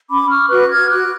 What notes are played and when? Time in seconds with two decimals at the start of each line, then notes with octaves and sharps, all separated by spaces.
0.10 C#4 B5 D6
0.30 C#6 F6
0.50 F#4 B4 D6 F#6
0.70 F6 G#6
0.90 F#4 D6 F#6